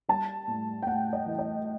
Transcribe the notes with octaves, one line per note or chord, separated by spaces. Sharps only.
G3 A5
A2
G5
A2 F#5
D#5
E3
D#5